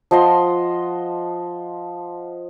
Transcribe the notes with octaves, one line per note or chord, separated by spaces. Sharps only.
F3 D#5 F#5 C6